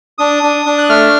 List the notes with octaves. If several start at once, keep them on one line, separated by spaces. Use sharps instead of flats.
D4 D#6
D4
D4
F#6
A3 F6